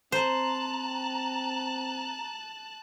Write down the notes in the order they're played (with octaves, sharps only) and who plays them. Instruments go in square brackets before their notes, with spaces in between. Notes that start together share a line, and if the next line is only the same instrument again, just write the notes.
[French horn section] C4 [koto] C5 [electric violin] A5 F#6 [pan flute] A#5